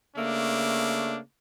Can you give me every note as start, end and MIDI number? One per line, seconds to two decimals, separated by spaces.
0.16 1.19 49
0.16 1.19 57
0.16 1.19 58
0.16 1.19 62